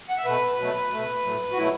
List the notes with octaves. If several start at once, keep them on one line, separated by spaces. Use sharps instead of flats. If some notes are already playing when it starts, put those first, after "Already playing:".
F#5
E5
B2 A3 B4
B2 F#3 A3
B2 A3
A2 F#3 A3
F#4
B2 F#3 A3 E4